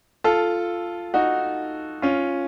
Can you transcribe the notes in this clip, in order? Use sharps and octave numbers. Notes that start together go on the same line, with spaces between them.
F4 A4
D#4 F#4
C#4 F4